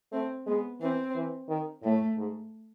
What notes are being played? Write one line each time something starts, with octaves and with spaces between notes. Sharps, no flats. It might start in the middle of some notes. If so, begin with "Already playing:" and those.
A3 C4
G#3 B3
E3 C4
E3
D#3
A2 A3
G#2